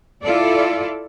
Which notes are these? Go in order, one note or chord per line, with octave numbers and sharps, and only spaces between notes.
E4 F4 A4 D5